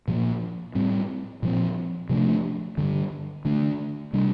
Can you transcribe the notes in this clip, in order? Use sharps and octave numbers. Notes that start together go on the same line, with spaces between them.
A#2 F3 A#3
A2 G3 C4
A#2 F3 C4
C3 F3 A3 D4
G2 D3 G3
D3 A3 D4
C3 G3 D4